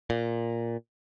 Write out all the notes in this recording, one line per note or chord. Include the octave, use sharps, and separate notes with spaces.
A#2